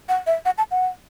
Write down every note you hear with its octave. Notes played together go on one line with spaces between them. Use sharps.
F#5
E5
F#5
A5
F#5